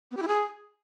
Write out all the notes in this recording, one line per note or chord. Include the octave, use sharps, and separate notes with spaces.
B3
G4
E4
G#4